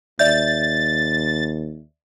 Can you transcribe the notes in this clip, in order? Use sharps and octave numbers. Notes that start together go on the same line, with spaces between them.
D#2 D5 E5 G6 A6